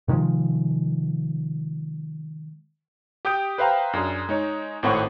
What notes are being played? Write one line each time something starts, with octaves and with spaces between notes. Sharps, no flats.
C3 D#3 F3 G#3
G4 G5 D#6 G6 D7
B4 C5 E5 F5 G5 A#5
F#2 D4 G#4
G#3 D#4 C#5
G#1 A2 C4 C#5 F#5 C#6